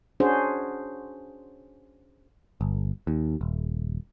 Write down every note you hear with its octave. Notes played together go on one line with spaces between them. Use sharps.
C#4 D4 F#4 G#4 C5
G1
D#2
D#1